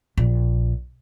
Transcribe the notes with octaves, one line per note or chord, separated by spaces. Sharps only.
A#1